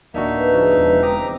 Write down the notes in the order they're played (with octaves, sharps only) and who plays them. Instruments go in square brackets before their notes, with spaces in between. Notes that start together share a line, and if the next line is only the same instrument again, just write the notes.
[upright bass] D1 [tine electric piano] A#3 D4 F#4 [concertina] D#4 E5
[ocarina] B4
[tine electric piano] C#3 F3 D4
[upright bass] E1
[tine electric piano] C4 [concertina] A#5 D6 D#6